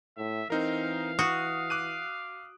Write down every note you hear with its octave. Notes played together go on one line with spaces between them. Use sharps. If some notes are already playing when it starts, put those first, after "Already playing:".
A2 E5
E3 C4 D#4 A#4 F5
F#4 D#6
D6 F#6 D#7